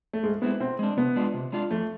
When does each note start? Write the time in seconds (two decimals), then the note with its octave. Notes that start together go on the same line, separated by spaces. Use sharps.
0.13 A3
0.23 G#2 G#3
0.42 G#3 B3 C4 E4
0.60 B2 C4
0.79 G#3 D4
0.97 C3 B3
1.16 G#3 D4 F4
1.34 C3
1.52 G#3 D4 F4
1.70 F2 A3